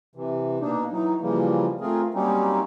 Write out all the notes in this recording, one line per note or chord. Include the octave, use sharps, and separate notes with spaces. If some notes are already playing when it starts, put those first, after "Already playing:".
C3 E3
B2 A#3 D4 D#4
E3 F#3 D#4
C#3 E3 F3 G3 A#3
A3 C4 F4 G#4 A#4
F#3 G3 A#3 C4 C#4 D#4